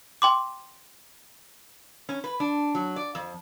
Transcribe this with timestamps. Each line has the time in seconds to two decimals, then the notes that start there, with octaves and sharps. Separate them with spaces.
0.22 G5 C6 D6
2.09 C#4
2.24 B4
2.40 D4
2.75 F#3
2.96 D5
3.15 F2